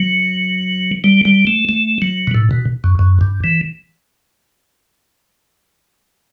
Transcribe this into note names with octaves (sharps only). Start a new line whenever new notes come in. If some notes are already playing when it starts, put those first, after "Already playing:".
Already playing: F#3
G3
G3
A3
A3
F#3
B2
A2
B2
F#2
F#2
G2
E3